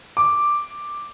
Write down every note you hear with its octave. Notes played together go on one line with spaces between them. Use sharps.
D6